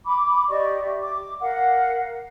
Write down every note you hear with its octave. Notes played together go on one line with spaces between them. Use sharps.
B5 D6
G4 D5 D#5 C#6
G4 E5
D6
A#4 F5 F#5